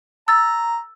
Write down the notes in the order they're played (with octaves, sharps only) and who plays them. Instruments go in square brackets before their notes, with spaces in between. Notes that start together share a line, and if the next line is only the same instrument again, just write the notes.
[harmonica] A#5 [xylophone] E6 A6